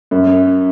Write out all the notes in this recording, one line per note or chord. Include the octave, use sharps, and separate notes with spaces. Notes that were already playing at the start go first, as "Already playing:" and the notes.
F#2